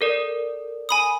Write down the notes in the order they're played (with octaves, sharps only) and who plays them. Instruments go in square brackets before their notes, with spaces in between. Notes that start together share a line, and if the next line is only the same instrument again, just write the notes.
[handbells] A4 A#4 D5
[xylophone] G#5 B5 D#6